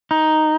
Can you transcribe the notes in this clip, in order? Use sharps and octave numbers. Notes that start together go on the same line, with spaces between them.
D#4